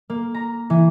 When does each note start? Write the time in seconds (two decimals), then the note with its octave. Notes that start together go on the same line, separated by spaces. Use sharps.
0.10 A#3
0.34 A#5
0.70 E3